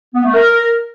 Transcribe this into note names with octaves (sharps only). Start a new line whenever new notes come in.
B3
A3
A#4